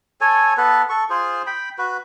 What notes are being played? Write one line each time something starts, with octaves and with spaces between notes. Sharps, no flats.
A4 C#5 G#5
B3 A4 B4
A4 C#6
F4 G#4 C5
G5 B5
F#4 B4